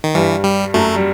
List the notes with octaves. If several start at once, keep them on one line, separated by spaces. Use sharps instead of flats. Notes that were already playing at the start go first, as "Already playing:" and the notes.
D#3
G2 E3 G3
G3
F#2 F#3 A3
G3